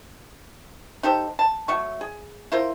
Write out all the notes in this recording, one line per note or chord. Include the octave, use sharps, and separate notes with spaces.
D#4 G4 A4 C5
A5
F#3 A3 C#6
G#4
E4 F4 A#4 C5